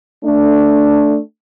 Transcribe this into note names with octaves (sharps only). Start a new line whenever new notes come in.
A3 D4